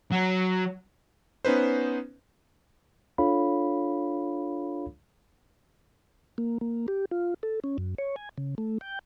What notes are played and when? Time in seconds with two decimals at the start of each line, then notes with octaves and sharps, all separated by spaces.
0.12 F#3
1.45 B3 C#4 D#4 B4 C5
3.18 D4 F4 A4 C#5 F5 B5
6.38 A#3
6.61 A#3
6.88 G4
7.11 F4
7.43 A4
7.64 C#4
7.78 F#2
7.98 C#5
8.16 G#5
8.38 C#3
8.58 A3
8.81 G5